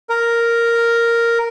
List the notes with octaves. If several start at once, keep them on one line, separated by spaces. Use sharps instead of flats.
A#4